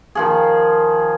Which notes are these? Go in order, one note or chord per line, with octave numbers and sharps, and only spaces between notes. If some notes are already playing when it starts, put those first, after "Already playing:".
D#3 F3 G#4